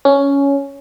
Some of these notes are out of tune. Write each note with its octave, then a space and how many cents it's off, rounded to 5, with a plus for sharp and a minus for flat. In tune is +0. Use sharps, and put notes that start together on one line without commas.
C#4 +10